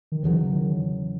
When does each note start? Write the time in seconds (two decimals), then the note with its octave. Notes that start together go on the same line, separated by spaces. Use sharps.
0.12 D#3
0.23 E2 C#3 E3 F#3
0.52 D#3